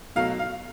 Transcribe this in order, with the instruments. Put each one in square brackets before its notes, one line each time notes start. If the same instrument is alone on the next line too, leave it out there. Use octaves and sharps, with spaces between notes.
[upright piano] B2 F#3 A3 F5
F5